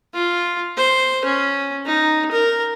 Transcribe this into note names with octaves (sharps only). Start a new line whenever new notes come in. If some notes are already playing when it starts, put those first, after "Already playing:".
F4
C5
C#4
D#4
A#4